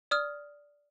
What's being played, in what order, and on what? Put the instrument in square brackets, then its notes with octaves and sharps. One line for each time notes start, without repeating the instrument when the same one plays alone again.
[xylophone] D5 D#6 F6